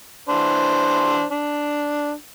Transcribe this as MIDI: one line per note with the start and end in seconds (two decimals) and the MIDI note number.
0.29 1.24 52
0.29 1.24 62
0.29 1.24 72
1.31 2.12 62